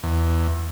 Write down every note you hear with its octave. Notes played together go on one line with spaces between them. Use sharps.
E2